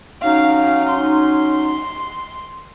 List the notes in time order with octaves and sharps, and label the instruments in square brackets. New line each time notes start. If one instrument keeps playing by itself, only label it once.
[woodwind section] F#3 C#4 D#4 [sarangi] F5
[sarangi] C6